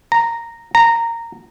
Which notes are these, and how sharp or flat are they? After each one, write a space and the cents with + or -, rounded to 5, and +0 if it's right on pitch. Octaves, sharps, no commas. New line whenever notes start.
A#5 -10
A#5 -15